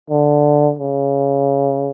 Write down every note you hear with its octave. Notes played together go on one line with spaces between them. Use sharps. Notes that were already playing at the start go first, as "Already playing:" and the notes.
D3
C#3